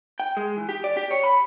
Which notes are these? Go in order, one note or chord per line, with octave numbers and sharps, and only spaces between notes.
G5
G#3
E3
G4
D5
G4
C#5
B5